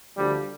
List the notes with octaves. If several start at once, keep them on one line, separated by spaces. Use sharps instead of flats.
D2 D3 F3 G3